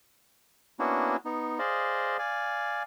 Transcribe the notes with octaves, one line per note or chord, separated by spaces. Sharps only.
A#3 B3 C#4 D4 E4 F#4
B3 D#4
G#4 C5 D5 D#5 F5
D5 F5 G#5